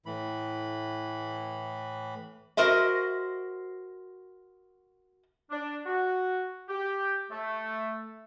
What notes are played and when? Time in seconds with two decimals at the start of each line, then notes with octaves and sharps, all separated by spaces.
0.06 A2 E3 B5
2.57 F#4 A#4 C5 D#5 E5
5.50 D4
5.86 F#4
6.69 G4
7.30 A3